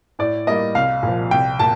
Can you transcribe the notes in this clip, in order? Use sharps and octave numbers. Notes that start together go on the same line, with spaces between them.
A2 D5
G3 A#3 D#5
C2 F5
A#2 F3
C2 G5
A#2 A5